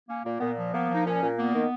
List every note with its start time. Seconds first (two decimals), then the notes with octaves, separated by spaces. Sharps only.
0.08 A#3 C#4
0.24 A#2 A#3
0.40 A#2 B3
0.57 F3
0.73 A#3 B3
0.89 F3
0.94 D#4
1.05 A#2 C#4
1.21 A#2
1.37 A#3 B3
1.54 D#3